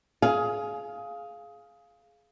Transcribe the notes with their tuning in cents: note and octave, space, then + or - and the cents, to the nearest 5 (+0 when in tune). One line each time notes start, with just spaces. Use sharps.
G#4 +20 F5 +0 G#5 +0